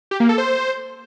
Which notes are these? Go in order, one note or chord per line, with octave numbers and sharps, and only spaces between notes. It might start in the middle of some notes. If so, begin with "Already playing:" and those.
G4
A#3
A4
C5